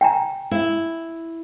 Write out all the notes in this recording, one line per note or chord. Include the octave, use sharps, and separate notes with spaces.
G5 G#5 A#5
E4